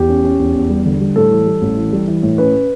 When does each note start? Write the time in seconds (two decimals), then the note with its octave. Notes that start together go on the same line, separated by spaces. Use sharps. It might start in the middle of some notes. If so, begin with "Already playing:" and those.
Already playing: E2 G4
0.09 C#4
0.24 C#4
0.39 E2
0.55 E2
0.70 G3
0.85 D3
1.00 G3
1.16 A2 A4
1.31 E3
1.46 G3
1.62 A1
1.77 E3
1.93 G3
2.07 E3
2.23 A2
2.38 C#4 B4